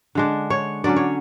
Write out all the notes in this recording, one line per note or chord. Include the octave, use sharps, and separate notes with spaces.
D3 G#3 D4
C#5
D3 F#3 C#4 D5
C#5